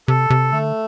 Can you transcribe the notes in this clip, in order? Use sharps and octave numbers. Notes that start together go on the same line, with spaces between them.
C3 A4
C3
D3 A3